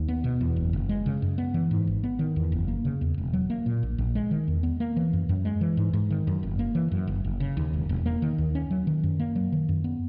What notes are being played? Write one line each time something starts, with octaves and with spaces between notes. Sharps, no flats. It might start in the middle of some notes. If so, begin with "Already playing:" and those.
Already playing: D#2
B3
B2
E2
F#1
F#1
G#3
C#3
F#2
B3
E3
G#2
G#1
B3
D#3
E2
F#1
A#3
C#3
E2
E1
F#3
A#3
A#2
A#1
A#1
G#3
D#3
E2
B3
A#3
E3
F#2
F#2
G#3
E3
G#2
G#2
D#3
F#2
F#1
A#3
E3
F#2
F#1
F#1
C#3
D#2
E1
E1
A#3
D#3
D#2
C#4
F#3
D#3
F#2
A#3
F#3
D#3
F#2
B3